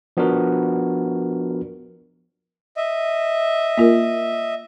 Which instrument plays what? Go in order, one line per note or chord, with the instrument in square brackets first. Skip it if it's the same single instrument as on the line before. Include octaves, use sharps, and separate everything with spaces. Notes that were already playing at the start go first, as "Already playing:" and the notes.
[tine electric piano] F3 B3 D4 F#4 A#4
[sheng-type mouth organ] D#5 E5
[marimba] A#3 F4 A#4